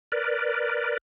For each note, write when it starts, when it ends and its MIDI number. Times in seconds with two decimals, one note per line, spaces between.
0.12 0.97 70
0.12 0.97 71
0.12 0.97 74